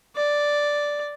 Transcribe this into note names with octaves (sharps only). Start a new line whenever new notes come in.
D5